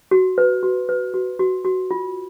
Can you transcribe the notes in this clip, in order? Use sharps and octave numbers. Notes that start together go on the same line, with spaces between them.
F#4
B4
F#4
B4
F#4
F#4
F#4
F4